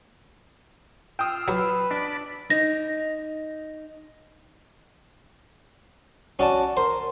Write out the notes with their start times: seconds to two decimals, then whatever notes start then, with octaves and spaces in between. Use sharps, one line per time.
1.19 F4 G5 D#6 E6
1.48 F#3 B4
1.91 D4 D5 B5
2.50 D#4 A#6
6.39 C#4 F#4 D5 A5
6.77 A#4 C5